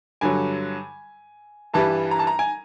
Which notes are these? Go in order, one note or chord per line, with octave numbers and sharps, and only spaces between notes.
G2 D3 F#3 G#5
G2 E3 G3 A5
A#5
A5
A#5
G#5